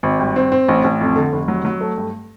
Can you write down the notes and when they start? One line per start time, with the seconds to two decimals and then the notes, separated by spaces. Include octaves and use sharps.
0.03 G#1
0.20 G2
0.36 C4
0.52 C4
0.68 A1
0.84 A1
1.01 F2
1.16 D3
1.32 F1
1.48 F#3
1.65 F#3
1.81 A3
1.98 G2